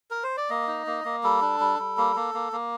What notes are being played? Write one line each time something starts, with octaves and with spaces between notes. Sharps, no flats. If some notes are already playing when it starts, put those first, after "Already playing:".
A#4
C5
D5
A#3 D#5
D#4
A#3
A#3
G3 A4
D4
G3
G3
A#3
A#3
A#3
A#3